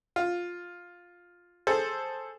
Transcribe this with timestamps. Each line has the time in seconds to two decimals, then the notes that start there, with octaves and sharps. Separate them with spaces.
0.16 F4
1.67 G#4 A4 C5